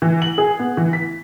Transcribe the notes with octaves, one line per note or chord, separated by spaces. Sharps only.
E3
F#7
G#4
B3
E3
B6